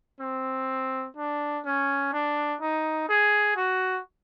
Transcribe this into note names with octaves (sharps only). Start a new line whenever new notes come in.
C4
D4
C#4
D4
D#4
G#4
F#4